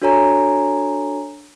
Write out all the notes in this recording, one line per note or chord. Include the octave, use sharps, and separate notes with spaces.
D4 F#4 A4 C#5 G#5 A#5